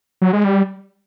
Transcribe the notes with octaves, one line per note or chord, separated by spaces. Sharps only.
F#3
G#3
G3